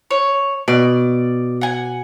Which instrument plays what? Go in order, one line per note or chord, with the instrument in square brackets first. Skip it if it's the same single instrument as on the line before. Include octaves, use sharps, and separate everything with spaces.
[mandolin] C#5
[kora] B2 [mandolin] D5
[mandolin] F#5 G#5